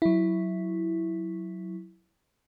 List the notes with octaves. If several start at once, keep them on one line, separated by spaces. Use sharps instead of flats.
F#3 E4